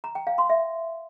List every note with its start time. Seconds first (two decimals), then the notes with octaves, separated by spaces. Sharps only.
0.04 A#5
0.15 G5
0.27 F5
0.38 C6
0.50 E5